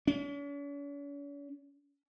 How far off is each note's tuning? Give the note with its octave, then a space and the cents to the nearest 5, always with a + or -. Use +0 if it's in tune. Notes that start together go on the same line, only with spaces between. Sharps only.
C#4 +45